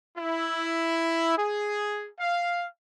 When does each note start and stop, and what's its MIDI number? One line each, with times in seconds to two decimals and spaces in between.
0.17 1.33 64
1.37 2.08 68
2.19 2.65 77